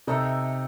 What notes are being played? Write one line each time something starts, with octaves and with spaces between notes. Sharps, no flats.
C3 D#4 A4 E5